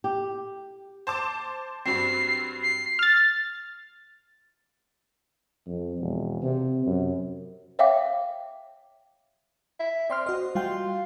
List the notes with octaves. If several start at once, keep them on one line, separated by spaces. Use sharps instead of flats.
G4
C5 A5 D6
G2 F#3 C4 C7
C7
F6 A6
F2
E1
C3
F#2
C#5 E5 F5 G5 D6
E5
C4 D5 C6 F6
F#4 C5 D#5
G3 F4 F#4 G5